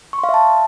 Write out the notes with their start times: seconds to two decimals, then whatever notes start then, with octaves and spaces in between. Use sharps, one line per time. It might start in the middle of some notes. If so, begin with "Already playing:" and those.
0.13 C#6
0.18 C6
0.24 F5
0.29 E5
0.34 A5